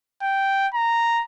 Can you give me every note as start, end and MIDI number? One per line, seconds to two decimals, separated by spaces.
0.23 0.67 79
0.74 1.23 82